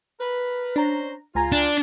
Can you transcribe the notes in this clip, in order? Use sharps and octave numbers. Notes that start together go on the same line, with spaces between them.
A#4 B4
C#4 D4 C5 A#5
C#2 F4 G#5 A#5
D4